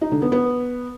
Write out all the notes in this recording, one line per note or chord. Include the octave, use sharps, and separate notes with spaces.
D#4
D3
B3
B3